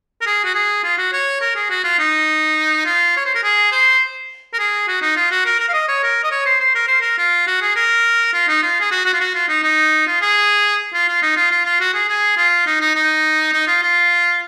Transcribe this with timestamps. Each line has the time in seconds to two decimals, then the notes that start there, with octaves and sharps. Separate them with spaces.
0.21 A#4
0.26 G#4
0.45 F#4
0.55 G#4
0.84 F4
0.98 F#4
1.13 C#5
1.41 A#4
1.56 G#4
1.70 F#4
1.84 F4
1.99 D#4
2.86 F4
3.17 C#5
3.26 C5
3.35 A#4
3.43 G#4
3.72 C5
4.54 A#4
4.59 G#4
4.88 F#4
5.02 D#4
5.16 F4
5.31 F#4
5.45 A#4
5.60 A#4
5.69 F5
5.73 D#5
5.88 C#5
6.03 A#4
6.24 D#5
6.31 C#5
6.46 C5
6.61 C5
6.75 A#4
6.87 C5
7.01 A#4
7.18 F4
7.47 F#4
7.62 G#4
7.76 A#4
8.33 F4
8.48 D#4
8.63 F4
8.80 G#4
8.91 F#4
9.06 F#4
9.13 F4
9.20 F#4
9.35 F4
9.49 D#4
9.63 D#4
10.07 F4
10.21 G#4
10.94 F4
11.08 F4
11.22 D#4
11.36 F4
11.51 F4
11.65 F4
11.80 F#4
11.94 G#4
12.08 G#4
12.37 F4
12.66 D#4
12.81 D#4
12.95 D#4
13.52 D#4
13.67 F4
13.82 F4